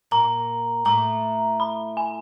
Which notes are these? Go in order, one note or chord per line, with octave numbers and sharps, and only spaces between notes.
A#2 A#3 A#5
A2 A3 A#5
B5
G#5